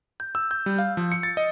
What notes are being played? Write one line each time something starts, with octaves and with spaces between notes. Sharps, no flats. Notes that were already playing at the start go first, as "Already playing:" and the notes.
G6
E6
G6
G3
F5
F3
C#7
A6
D#5